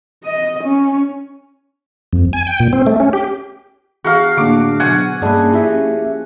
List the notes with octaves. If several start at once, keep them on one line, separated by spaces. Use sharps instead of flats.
D#5
C#4
F2
G#5
G5
A#2
C4
A3
C#4
G4
E2 F#4 F5 C6
A2 D3 A#3 D4 D6
B2 F#3 F#4 C5 D5 F#5 G#5
G2 G#3 A#3 C#4 E4 D5 A5
F3 E4 G4 E5